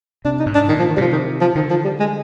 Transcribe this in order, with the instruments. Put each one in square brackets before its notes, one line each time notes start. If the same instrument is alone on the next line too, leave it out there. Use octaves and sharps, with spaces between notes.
[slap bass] C3 [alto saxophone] D4
[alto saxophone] D#4
[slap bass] G#2
[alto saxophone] D4
[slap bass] A#2 [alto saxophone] D#3
[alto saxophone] F3
D#3
[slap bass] C3 [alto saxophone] F3 G3
[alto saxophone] D#3
F3
[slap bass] D3 [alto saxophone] D#3
[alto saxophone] F3
G3
G#3